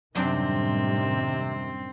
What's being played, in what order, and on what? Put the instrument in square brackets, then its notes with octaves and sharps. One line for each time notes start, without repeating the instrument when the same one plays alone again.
[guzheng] F#2 D4 G5 [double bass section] A2 D#3 G3 [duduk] C3 [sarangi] C4